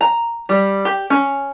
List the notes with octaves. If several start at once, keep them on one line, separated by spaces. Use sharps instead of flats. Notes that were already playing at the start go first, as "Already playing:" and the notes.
A#5
G3
G4
C#4